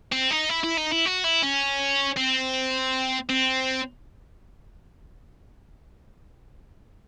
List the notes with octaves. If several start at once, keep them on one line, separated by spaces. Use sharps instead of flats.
C4
D#4
E4
E4
D#4
E4
F#4
E4
C#4
C4
C4